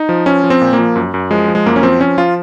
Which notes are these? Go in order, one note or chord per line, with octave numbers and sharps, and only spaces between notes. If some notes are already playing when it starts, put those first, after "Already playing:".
Already playing: D#4
F3
F3 C#4
F3
C4
A#2
A#3
F3
F#2
F#2
F3 G#3
F3
G#3
F#2 A#3
C#4
F3 C4
F3 C#4
F3 F4